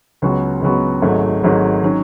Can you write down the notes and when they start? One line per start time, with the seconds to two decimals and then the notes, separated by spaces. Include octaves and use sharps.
0.22 C#2 C#3 F#3 B3 F#4
0.62 C#2 C#3 F#3 B3 F#4
1.02 G#1 G#2 F#3 A3
1.42 G#1 G#2 F#3 A3
1.84 D#3 F#3 C#4